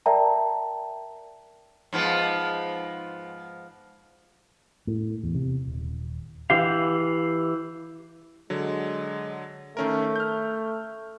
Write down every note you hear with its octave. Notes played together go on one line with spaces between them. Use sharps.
A#4 D5 E5 G5 A5 A#5
G#2 F3 B3
A2
E2
C3
D#1
E3 G4 F5
D3 F#3 G#3
D#3 A3 C#4 A#4
F6 G6